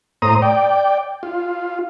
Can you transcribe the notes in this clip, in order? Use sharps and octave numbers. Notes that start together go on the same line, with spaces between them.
A2 C5 A#5 D#6
D5 G5
F4